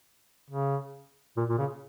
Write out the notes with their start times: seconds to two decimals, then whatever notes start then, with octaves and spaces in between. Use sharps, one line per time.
0.51 C#3
1.37 A#2
1.49 A#2
1.59 C#3